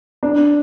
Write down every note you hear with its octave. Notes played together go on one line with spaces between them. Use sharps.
D4